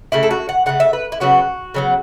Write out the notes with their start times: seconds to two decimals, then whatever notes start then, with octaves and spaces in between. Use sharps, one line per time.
0.12 C#3 A3 E4
0.23 A4
0.31 F#4
0.49 F#5
0.66 C#3 A3 F#5
0.80 E5
0.93 B4
1.12 E4
1.20 C#3 F#3 B3 F#4
1.74 C#3 F#3 B3